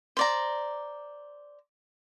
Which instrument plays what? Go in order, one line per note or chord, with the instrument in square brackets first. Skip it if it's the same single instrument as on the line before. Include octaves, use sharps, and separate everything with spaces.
[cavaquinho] C5 D5 A#5